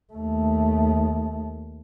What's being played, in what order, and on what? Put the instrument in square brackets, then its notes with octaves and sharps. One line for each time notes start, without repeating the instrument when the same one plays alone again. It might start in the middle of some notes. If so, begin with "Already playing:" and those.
[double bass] D#2 A3